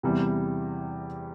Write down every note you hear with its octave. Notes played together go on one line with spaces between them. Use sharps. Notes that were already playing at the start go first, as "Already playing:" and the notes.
E2 C3 E3 G3